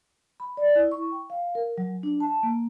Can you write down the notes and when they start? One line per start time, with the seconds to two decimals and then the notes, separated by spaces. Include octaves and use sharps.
0.40 B5
0.57 D5
0.75 E4
0.92 C#6
1.12 G5
1.30 F5
1.55 A#4
1.78 F#3
2.03 D4
2.20 A5
2.43 A#3